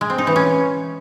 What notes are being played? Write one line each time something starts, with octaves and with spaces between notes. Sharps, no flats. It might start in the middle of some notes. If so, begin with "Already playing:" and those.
G#3
C4
D#4
E3
C#4